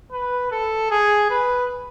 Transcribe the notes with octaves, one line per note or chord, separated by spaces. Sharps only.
B4
A4
G#4
B4